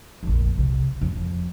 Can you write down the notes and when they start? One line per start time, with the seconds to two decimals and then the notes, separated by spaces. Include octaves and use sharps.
0.23 A#1 F2
0.58 C2
1.01 F2